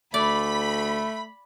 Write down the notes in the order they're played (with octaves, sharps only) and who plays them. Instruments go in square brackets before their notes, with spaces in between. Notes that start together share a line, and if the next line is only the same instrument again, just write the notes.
[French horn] D2 [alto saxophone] A3 [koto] D5 [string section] B5